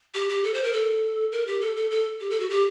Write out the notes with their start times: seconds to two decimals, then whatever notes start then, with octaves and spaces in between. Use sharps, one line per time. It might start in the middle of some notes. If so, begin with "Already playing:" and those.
0.14 G4
0.29 G4
0.44 A4
0.54 C5
0.64 A#4
0.73 A4
1.32 A#4
1.47 G4
1.61 A4
1.76 A4
1.91 A4
2.21 G4
2.30 A4
2.40 F#4
2.50 G4